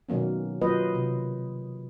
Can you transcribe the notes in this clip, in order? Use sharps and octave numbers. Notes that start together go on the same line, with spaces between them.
B2 D#3 F#3 A#3 C#4
F#3 A#3 F4 B4 C5 D#5
C3